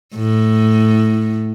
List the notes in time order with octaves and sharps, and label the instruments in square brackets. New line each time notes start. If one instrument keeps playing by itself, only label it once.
[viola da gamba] A2